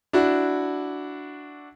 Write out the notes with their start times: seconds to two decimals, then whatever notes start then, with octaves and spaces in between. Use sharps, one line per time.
0.13 D4 E4 F#4